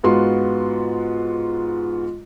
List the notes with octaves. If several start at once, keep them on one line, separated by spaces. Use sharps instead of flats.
G#2 B3 F4 F#4 C6